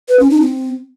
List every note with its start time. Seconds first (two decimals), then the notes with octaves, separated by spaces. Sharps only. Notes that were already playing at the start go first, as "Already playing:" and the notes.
0.09 B4
0.19 C#4
0.30 D#4
0.41 C4